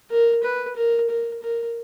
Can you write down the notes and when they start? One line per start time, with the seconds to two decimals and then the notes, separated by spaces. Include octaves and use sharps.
0.11 A#4
0.43 B4
0.76 A#4
1.09 A#4
1.42 A#4